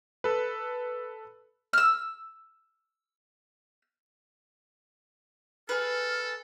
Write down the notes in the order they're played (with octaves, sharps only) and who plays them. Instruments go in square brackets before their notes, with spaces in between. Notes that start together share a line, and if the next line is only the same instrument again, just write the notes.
[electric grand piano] A4 B4
[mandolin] E6 F6
[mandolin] G#4 B4 [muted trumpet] A4 [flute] F6